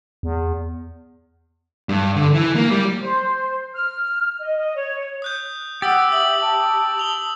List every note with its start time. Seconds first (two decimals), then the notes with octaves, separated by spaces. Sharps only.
0.23 E2
1.89 G2
2.16 D3
2.34 E3
2.56 A#3
2.71 G3
3.01 C5
3.74 F6
4.39 D#5
4.56 D#5
4.76 C#5
5.22 D#6 F#6 G6
5.82 G4 F#5 D#6 E6 A6
6.12 E5 E6 F#7
6.41 A5
6.98 D#6 F7 G7